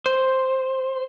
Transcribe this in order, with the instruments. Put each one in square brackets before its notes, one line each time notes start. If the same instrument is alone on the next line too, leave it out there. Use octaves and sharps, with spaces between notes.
[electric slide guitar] C5